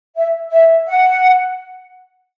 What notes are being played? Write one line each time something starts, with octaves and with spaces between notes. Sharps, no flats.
E5
E5
F#5